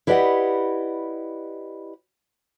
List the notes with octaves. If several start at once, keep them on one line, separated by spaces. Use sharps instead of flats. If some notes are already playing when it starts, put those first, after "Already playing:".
E4 G4 B4 D5 D#5 F#5